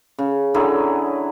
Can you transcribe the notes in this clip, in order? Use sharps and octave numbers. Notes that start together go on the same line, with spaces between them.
C#3
D3 F#3 E4 G#4